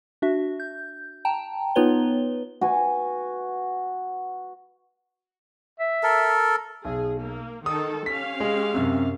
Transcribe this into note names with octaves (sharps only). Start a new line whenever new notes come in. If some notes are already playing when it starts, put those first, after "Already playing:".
D4 F#4 E5
G6
G5 A5 A#5
B3 D#4 F4 B4 C#5 G7
F#4 B4 G#5
E5
A4 A#4
B1 G#4
A#3
D#3 A4 A5 D#6
C#4 G4 F5 B6
G#3
F#2 C3